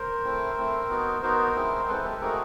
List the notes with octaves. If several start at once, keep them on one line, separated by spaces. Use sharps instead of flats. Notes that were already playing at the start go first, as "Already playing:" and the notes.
Already playing: A#4 C5
A3 C4 E4
A3 C4 E4
B3 D#4 F#4
B3 D#4 F#4 A#4 C5
G#3 C4 E4
G#3 C4 E4 A4 B4
G4 A4
A3 C4 D#4 F#4 G#4 A#4